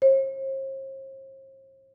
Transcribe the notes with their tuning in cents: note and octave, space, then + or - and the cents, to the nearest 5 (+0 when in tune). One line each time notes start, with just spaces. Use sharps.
C5 +45